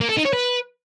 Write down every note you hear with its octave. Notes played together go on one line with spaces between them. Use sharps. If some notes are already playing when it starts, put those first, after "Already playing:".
A#3
A4
D#4
C#5
B4